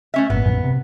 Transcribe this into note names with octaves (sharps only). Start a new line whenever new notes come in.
A3 C#4 E5
G1 A#2 B3
A#1 F#2
C3